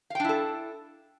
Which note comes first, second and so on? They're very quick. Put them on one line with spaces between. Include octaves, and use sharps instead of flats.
F5 G5 D4 E4 A4